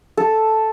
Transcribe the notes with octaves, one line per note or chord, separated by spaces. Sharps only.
A4